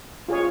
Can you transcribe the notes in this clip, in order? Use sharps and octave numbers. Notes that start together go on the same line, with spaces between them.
F4 G#4 C#5